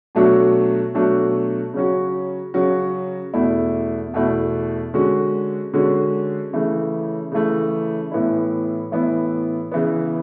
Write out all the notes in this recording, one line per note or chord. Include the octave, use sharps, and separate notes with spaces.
B2 F#3 A3 D4 F#4
B2 F#3 A3 D4 F#4
C#3 F#3 C#4 F#4
C#3 F#3 C#4 F#4
E2 B2 A3 E4
E2 B2 A3 E4
D3 G#3 C#4 F#4
D3 G#3 C#4 F#4
C#3 E3 A3
C#3 E3 A3
A2 E3 B3 E4
A2 E3 B3 E4
C#3 E3 B3